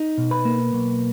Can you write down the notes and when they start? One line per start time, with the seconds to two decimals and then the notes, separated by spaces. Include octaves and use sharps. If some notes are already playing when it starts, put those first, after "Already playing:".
Already playing: D#4
0.18 B2
0.31 B4 B5
0.45 A#3
0.73 B1